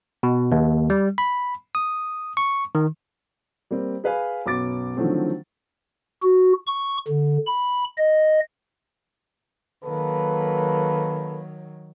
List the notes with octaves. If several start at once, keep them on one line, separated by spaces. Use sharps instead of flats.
B2
D#2
G3
B5
D#6
C#6
D#3
G3 A#3 C4
G#4 B4 F5 G#5
B1 F#2 B3 D6 A6
D3 D#3 F3 F#3 A3 C4
F#4
C#6
D3
B5
D#5
D#3 F#3 A#3 A4 B4